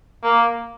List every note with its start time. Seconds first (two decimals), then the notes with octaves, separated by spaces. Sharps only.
0.24 A#3